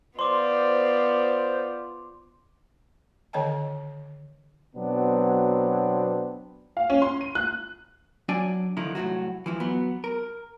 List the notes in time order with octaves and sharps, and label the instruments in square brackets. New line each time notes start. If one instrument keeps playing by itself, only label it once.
[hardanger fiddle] B3 F4 [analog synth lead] C5 [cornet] D5 [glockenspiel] C6 D6
[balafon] D3 D#3 C#5 D#5 G5 A5
[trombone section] B2 F#3 B3 C4 D4
[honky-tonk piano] F5
C#4
C6
D#7
F#6
[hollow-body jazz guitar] F#3 D4 D5 G#5
D3 D#3 F3 D#4 E4
C2 A2 D3 F#3 F#4
E3 F3 E4
F#3 B3
A#4